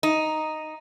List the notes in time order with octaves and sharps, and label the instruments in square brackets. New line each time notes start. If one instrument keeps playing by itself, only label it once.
[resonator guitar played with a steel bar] D#4